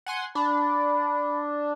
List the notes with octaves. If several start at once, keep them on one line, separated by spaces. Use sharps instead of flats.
F#5 G#5 C6
D4 B5